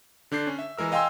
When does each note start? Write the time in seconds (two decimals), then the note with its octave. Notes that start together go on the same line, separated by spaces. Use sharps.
0.31 D3 D4 G6 C7
0.47 C#4
0.59 E5
0.78 E3 G#3 A#4 E6
0.92 D#5 F5 G5 G#5 C6 E6